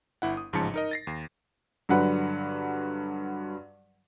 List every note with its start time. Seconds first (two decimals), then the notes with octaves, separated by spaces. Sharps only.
0.22 G1 E4 F#5
0.37 D#6
0.53 A1 G#2 C#3 F3 A5 C#7
0.74 D#4 A#4 D#5
0.91 A6 A#6 C7
1.07 D#2
1.89 G2 D3 F#3 B4 F#5